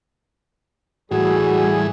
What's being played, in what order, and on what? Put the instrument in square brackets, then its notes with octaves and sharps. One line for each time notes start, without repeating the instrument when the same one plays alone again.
[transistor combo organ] A2 E3 [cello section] G3 [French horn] F#4 [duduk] G#4